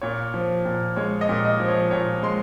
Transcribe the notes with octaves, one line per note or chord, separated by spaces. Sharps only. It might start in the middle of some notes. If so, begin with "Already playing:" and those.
A#2 C#5
F3
A#2
G#3 C#5
D#5
A#2
D#5
F3
C#5
A#2 C#5
G#3 C6